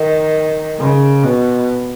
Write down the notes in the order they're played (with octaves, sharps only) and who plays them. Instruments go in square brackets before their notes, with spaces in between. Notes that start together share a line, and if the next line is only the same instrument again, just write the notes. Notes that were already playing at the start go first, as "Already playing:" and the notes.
Already playing: [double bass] D#3
C#3
B2